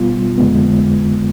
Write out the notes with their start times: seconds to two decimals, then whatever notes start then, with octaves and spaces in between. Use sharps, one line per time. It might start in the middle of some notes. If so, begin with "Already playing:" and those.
Already playing: B2 G3 B3 F4
0.38 F2 D3 G#3 B3